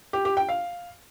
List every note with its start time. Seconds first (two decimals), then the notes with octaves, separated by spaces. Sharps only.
0.13 G4
0.25 G4
0.37 G5
0.49 F5